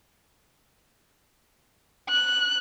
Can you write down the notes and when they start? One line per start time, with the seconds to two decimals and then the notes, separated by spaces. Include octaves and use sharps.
2.09 F#6